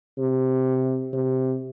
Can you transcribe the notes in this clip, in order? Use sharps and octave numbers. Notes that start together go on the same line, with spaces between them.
C3
C3